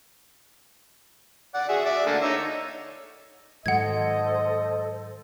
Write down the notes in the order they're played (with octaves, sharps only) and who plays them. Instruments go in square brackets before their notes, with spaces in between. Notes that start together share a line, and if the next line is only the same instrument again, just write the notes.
[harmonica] D5 F#5
F#4 G#4 E5
D5 E5
D3 A3 A#3
D#4 C#5 E6
[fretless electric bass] G#2 D#3 F#3 [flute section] A4 C5 [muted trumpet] D#5 [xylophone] F#5 G#6